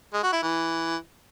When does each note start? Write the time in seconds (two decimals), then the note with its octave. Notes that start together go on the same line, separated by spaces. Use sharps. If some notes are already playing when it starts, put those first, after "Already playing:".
0.14 G#3
0.23 F#4
0.33 E4
0.42 E3